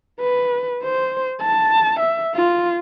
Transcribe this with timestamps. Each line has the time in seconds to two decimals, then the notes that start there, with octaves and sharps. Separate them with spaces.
0.21 B4
0.83 C5
1.41 A5
2.00 E5
2.35 F4